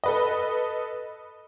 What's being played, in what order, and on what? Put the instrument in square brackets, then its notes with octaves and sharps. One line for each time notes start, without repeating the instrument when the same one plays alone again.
[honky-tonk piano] A4 B4 D#5